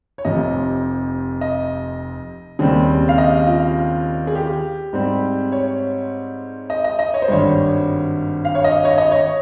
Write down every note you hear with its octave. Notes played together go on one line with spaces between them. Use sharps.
C#5
F1 F2 C3 D#5
D#5
D#2 C#3 G3 C4
F5
D#5
F4
G#4
G4
G#2 G3 C4
C#5
D#5
D#5
D#5
C#5
C5
G#1 G2 G3 C#5
F5
C#5
D#5
C#5
D#5
C#5